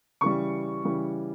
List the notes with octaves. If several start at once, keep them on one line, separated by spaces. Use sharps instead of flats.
C#3 E3 G3 C#6
C#3 E3 G3